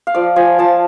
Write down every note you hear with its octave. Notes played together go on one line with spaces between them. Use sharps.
F5
F3 D5
F3 G#5
F3 A5